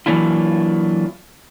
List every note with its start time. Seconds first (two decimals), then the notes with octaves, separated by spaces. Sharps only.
0.06 E3 F#3 A#3 D4 E4 F4